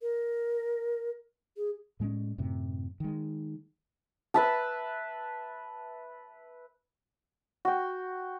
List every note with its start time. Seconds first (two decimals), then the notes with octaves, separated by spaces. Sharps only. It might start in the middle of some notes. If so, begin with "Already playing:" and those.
0.02 A#4
1.57 G#4
2.00 A2 G#3 C4 C#4
2.38 F#2 A2 C3
3.00 D#3 G#3
4.34 B4 E5 A5
7.65 F#4 G5